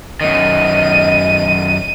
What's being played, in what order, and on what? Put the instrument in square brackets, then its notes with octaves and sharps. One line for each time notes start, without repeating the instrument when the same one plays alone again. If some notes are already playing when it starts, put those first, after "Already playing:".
[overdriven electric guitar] F#2 D#3 [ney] D#5 [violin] D#7